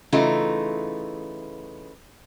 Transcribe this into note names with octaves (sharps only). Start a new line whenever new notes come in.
C#3 E3 A3 D#4 F4